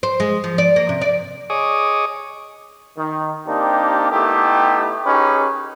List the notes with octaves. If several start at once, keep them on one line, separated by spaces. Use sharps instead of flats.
C5
G#3
F3
D5
A#3
C3
D5
G#4 C#5 D#5 D6 D#6
D#3
A#3 C4 D4 D#4 G4
A3 B3 D#4 E4 G4
C#4 D#4 G4 G#4 A#4 B4